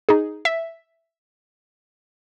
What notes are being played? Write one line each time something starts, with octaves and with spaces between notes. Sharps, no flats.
D#4 G#4
E5